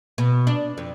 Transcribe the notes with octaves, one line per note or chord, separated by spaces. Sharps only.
B2
D4
F2